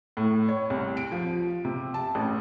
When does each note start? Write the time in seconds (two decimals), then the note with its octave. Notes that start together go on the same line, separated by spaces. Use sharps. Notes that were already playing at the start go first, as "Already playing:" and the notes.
0.17 A2
0.49 C#5
0.70 C2
0.97 D7
1.12 F3
1.65 C3
1.94 A5
2.15 A1